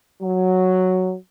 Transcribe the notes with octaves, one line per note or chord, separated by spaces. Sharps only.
F#3